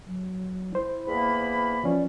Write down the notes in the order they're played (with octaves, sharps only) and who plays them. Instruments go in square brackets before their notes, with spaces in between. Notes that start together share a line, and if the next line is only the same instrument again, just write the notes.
[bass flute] F#3
[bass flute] E4 [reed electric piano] C5
[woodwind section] E2 A#3 B5
[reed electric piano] E3 F3 C#4 [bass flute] D5